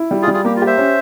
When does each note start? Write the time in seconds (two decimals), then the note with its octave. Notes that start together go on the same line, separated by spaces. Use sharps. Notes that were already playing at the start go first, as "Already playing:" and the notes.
Already playing: E4
0.11 G3
0.22 F4 G#4
0.28 G3
0.33 F4 G#4
0.45 A#3 G4
0.56 F4
0.62 G4 C5 E5
0.78 C#4